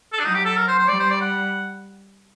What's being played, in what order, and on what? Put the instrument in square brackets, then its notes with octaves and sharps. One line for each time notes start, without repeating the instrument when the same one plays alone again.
[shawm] A4
D4
[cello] F#3 [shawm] D#4
[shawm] G4
A4
A#4
C5
C5
[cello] G3 [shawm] D5
[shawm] C5
D5
F#5